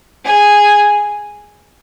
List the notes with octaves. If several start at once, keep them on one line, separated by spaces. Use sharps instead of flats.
G#4